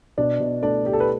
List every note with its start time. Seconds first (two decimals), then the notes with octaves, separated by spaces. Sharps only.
0.18 B2 D4 D5
0.40 B2
0.62 A3 D4 D5
0.85 A3 G4
0.93 A4
1.00 B4